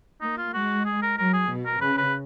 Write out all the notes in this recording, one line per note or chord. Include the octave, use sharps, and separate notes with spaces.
A#3 D#4
F4
G#3 F#4
G#4
A#4
F#3 A#4
G#4
B2
A#4
C#3 B4
B4